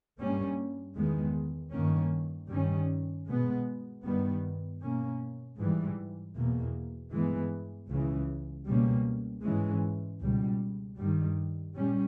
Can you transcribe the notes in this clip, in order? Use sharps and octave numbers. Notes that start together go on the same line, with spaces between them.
G2 G3 A#3 C#4
E2 D#3 G#3 B3
G2 D#3 A#3 C#4
G2 D#3 G3 C#4
B2 G#3 B3
G2 D#3 G3 B3
B2 A#3 C#4
G#2 E3 G3
E2 B2 A#3
G2 E3 G#3 B3
C#2 C#3 E3
C#2 B2 G3 A#3 C#4
G#2 E3 G#3 C#4
C#2 B2 G3
G2 D#3 G3
A#2 G3 C#4